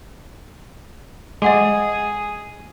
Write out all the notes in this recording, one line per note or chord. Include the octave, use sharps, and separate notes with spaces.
G#3 G#4 D#5 F#5 D6